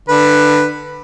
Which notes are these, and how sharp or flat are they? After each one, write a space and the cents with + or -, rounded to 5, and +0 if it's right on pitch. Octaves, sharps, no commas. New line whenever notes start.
D3 +20 B4 +0